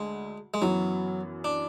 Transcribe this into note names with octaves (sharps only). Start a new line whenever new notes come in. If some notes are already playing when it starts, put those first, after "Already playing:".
Already playing: D2 D3 G#3
G#3
F#2 E3 F#3 B3 E4
D4